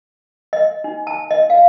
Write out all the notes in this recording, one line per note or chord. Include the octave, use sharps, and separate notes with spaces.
D#5
D#4
A5
D#5
F5